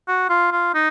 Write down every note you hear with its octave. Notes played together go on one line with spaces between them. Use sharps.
F#4
F4
F4
D#4